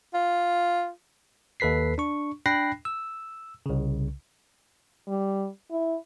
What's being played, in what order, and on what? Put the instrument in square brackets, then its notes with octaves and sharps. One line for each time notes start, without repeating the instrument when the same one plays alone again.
[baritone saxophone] F4
[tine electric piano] D#2 A4 B4 B6 C7
D4 C#6
D4 G5 B5 F#6 A#6 C7
E6
C2 C#3
[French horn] G3
E4